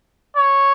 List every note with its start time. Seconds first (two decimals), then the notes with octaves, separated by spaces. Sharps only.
0.36 C#5